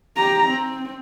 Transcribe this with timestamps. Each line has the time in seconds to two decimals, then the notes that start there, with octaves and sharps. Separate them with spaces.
0.16 G4 A#5
0.48 C4